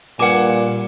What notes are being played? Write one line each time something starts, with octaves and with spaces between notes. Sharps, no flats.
G2 A#2 A#3 F#5 G#5 D6 E7